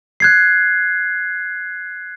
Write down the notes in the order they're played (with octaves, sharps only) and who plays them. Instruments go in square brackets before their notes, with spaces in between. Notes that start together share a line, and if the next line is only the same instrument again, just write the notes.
[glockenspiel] F#6 G#6 C7